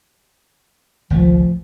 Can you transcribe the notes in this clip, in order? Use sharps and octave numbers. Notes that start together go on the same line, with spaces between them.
G#1 C#2 F3 A3